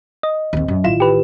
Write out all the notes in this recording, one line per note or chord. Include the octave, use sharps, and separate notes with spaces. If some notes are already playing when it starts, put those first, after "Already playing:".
D#5
D#2 C4
F#2
A1 D#3 E4 F4 E7
G4 B4